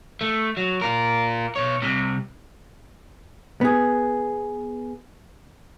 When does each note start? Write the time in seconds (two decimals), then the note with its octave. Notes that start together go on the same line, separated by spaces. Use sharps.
0.21 A3
0.57 F#3
0.82 F4 A#4
1.56 B2 C#5
1.82 C2 C3
3.61 B3 G#4